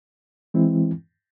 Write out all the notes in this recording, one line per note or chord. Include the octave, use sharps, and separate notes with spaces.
E3 G#3 C4 E4